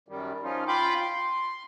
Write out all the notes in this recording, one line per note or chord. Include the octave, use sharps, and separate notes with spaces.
F#2 D#3 G3
F3 C#4 D#4 F4
F4 G5 B5 C6 D6 G6
C6